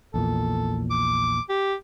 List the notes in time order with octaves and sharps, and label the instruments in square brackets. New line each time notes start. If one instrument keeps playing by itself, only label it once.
[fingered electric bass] A#1 E2 A#2 [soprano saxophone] A4
[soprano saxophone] D6
G4